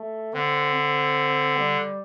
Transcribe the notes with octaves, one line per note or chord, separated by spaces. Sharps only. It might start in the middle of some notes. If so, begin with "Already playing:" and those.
Already playing: A3
D3 C4
C4
G3